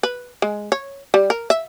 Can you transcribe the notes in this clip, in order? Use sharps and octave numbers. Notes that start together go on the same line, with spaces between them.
B4
G#3
C#5
G3
A#4
E5